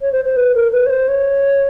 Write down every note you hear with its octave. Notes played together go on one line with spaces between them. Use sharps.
C#5
C5
C5
B4
A#4
B4
C#5
C5
C#5